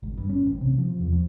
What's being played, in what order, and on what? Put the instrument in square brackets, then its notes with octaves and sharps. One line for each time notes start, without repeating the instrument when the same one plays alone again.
[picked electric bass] G#1
G2
C#4
A1
C3
F3
E2
F3